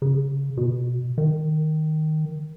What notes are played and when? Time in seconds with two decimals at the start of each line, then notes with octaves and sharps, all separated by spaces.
0.02 C#3
0.57 B2
1.18 D#3